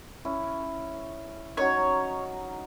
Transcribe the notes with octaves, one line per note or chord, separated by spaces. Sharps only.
C#4 E4
F#3 C#4 D#4 C#5